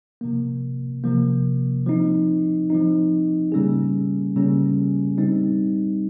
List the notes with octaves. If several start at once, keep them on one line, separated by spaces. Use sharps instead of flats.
C3 F3 A#3
C3 F3 A#3
F3 C4 D#4
F3 C4 D#4
C#3 G3 A#3 C#4 G#4
C#3 G3 A#3 C#4 G#4
G3 C4 D#4